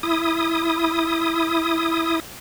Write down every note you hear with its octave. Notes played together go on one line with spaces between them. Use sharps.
E4 D#6